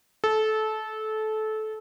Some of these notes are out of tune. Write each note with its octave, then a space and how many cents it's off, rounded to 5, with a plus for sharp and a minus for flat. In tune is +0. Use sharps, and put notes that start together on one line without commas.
A4 -20